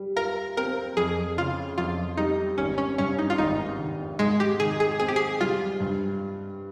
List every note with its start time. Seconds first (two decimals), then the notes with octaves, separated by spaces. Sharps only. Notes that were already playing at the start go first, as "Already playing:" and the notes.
Already playing: G3
0.16 F4 A#4
0.57 C4 A#4
0.97 F2 G#4
1.37 C#3 F4
1.78 F2 F4
2.17 G3 D#4
2.58 G#1 C#4
2.78 C#4
2.98 G2 C#4
3.19 D#4
3.30 F4
3.38 G#1 D#4
3.79 D#3
4.19 G#2 G#3
4.40 G4
4.60 D#3 G#4
4.80 G#4
4.99 C4 G#4
5.08 G4
5.16 G#4
5.41 G3 F4
5.80 G2